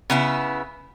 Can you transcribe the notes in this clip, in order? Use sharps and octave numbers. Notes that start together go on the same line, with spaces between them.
C#3 B3 E4